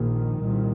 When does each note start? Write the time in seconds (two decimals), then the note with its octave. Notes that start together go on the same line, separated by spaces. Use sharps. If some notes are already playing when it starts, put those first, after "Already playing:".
Already playing: A#1 A#2 D#3
0.41 C2 A#2